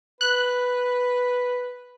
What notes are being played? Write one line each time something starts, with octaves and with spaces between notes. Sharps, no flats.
B4 F#6